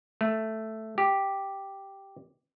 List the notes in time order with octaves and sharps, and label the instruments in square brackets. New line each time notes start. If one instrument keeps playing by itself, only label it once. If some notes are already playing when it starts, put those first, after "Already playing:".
[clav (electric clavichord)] A3
G4